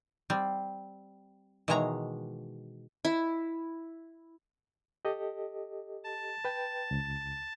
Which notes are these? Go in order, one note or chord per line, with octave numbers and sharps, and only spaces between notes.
G3 C4
B2 D#3 E3 G#3 C#5 A#5
E4
G4 A4 D#5
A5
B4 G5
C#2